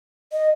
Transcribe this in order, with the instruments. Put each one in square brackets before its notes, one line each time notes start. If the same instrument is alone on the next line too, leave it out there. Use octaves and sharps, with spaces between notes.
[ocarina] D#5